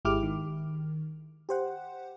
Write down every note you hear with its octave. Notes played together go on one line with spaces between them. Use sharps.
G#1 G#3 E4 G4 D6 F6
D#3
G4 C5 F#5